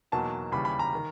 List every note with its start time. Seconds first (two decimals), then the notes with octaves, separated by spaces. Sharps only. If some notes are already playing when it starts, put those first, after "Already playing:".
0.12 E2 B2 F#3 A#3 D#4 A5
0.52 D#2 C#3 E3 G3 B5
0.65 B5
0.79 A#5
0.95 D#3